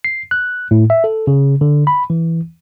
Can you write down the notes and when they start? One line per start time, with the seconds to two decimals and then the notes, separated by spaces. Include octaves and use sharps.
0.04 C7
0.31 F#6
0.71 A2
0.90 E5
1.04 A4
1.27 C#3
1.61 D3
1.87 B5
2.10 E3